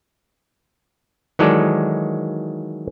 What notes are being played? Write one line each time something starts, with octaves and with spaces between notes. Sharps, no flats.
D#3 E3 F#3 G#3 A4 D5